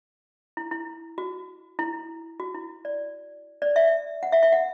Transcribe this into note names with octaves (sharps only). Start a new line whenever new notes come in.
E4
E4
F#4
E4
F#4
E4
D5
D5
E5
F#5
E5
E5
F#5